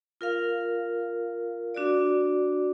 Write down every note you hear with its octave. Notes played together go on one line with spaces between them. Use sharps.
F4 A#4 F5
D4 F#4 D5